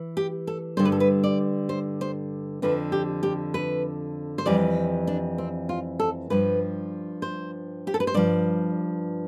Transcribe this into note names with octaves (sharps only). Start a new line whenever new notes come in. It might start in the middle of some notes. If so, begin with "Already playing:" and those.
Already playing: E3
G4
A4
G2 D3 G3 C5
B4
A4
B4
D5
C5
C5
F2 D3 F3 B4
G4
G4
B4
C5
F2 E3 G3 D5
D4
C4
F4
A4
G2 F3 B4
C5
G4
A4
B4
C5
G2 F3 D5